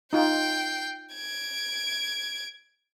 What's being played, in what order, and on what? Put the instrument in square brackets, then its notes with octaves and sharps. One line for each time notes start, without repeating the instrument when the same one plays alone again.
[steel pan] D#4 F4 [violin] G5 C7
[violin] G#6 D7